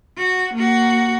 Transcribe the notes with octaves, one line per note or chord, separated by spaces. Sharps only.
F#4
A#3 F#4